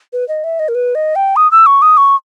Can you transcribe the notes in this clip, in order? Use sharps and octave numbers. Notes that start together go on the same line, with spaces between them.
B4
D#5
E5
D#5
A#4
B4
D#5
G5
D#6
E6
C#6
D#6
C#6